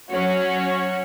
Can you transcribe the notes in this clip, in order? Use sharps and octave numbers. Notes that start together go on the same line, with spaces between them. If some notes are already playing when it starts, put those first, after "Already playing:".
F#3 C#4 F#4 C#5